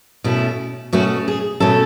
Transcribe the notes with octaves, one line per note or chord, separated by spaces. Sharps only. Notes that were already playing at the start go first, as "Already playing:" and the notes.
B2 A3 C#4 E4
B2 A3 C#4 F#4
G#4
B2 A3 C#4 A4